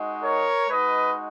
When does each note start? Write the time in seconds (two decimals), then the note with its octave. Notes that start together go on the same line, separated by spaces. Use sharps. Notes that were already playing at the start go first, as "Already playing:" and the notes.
Already playing: G#3 D#4 F#4
0.23 A#4 C#5
0.70 G#3 D#4 F#4 B4 D#5